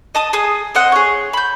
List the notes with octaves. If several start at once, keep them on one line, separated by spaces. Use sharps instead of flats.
D#5 A5 D#6
G#4 D#6
C4 D#5 F#5
G#4 C#5
B5 G6